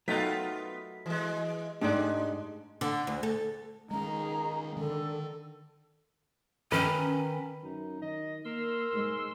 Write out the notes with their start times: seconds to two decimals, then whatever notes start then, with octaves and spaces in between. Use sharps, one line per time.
0.08 F#3 A3 B3 D#4 F4 A#4 G5 B6
1.06 E3 G#3
1.81 G#2 G#3 A3 D4 D#4 G4 D5
2.81 D3
3.07 D2
3.23 A4
3.91 D#3 G#3 C#4 G#4 A#5
4.77 D3 D#3 A4
6.72 D#3 C#4 B4 A#5
7.63 F#2 D#4
8.02 D#3 D#5
8.45 A#3 A#4 C6 E6
8.93 G#2 G#3